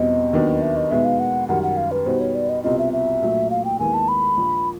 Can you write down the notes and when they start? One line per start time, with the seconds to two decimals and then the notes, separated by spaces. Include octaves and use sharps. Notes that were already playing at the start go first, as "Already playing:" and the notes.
Already playing: E2 B2 G3 C4 D#5
0.33 D#2 D#3 F#3 B3 D4
0.62 E5
0.77 D#5
0.91 B2 G#3 B3 D#4 E5
1.05 F5
1.20 F#5
1.49 F#2 D#3 G3 F#5
1.63 F#5
1.77 F5
1.91 B4
2.06 B2 G3 B3 D#4 F#4 C5
2.20 C#5
2.35 D5
2.49 D#5
2.64 C2 B2 G3 C4 F4 D#5
2.79 E5
2.93 E5
3.22 A#1 A#2 F#3 A3
3.50 F5
3.65 G5
3.79 D#2 D#3 G#3 B3 E4 G#5
3.94 A5
4.08 B5
4.37 A#1 A#2 F3